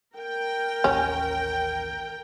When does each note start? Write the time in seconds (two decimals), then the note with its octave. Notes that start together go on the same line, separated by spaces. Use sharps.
0.15 A#4 G5
0.84 A1 D#2 C#4